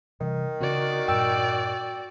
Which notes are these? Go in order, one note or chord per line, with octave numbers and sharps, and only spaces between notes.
C3 D#3 E3 G3
C#3 C4 C#4 F#4 D5
G2 A#2 G5 E6